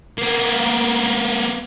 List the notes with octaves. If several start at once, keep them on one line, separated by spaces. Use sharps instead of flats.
A#3 B3